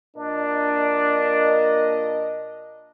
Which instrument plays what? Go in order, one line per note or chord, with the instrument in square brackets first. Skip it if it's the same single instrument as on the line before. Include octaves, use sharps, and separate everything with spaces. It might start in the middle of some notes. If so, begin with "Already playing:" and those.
[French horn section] A#2 A#4 D#5 [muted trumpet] D4